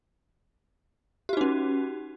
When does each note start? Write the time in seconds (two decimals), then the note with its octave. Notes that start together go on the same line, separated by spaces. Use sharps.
1.29 G4
1.33 F#4
1.37 D#4
1.41 C#4